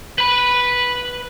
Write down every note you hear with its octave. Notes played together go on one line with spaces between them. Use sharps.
B4 B5